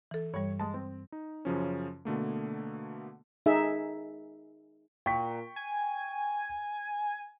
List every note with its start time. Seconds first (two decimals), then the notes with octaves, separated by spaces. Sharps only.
0.11 E3 A4
0.34 G2 E3 G3 C#5
0.59 G#3 A5
0.74 C4
1.12 D#4
1.45 F#2 C#3 F3 C#4
2.05 B2 D3 A3 A#3
3.46 D#4 G#4 E5
5.06 A#2 G5 C#6 B6
5.56 G#5